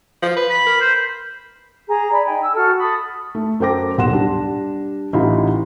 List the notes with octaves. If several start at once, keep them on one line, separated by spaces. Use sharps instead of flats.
F3
B4
B5
A#4
C5
G#4 A#5
D5 B5
D#4 G5 G#5
E6
F#4 A4 F6
A5 B5 D#6
A3
F#2 A4 C5 G5 D6 A#6
D#1 B1 F#5 C6 E7
G3 D4
A1 E3 D#4 F4 G4 B5